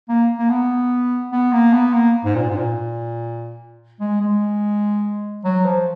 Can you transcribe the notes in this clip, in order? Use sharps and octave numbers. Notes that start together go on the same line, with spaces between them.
A#3
A#3
B3
B3
A#3
B3
A#3
G#2
A#2
G#2
A#2
G#3
G#3
F#3
F3